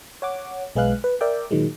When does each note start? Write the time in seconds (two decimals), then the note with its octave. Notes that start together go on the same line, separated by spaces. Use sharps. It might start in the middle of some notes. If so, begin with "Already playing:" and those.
0.22 C#5 F#5 D6
0.76 B1 G#3 G#4 B4 F5 F#6
1.04 B4
1.21 A#4 D5 E5 G5
1.51 A#2 D#3 F#3 G#3